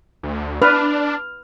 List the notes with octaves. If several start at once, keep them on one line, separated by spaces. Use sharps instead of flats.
D2
D4 B4 F6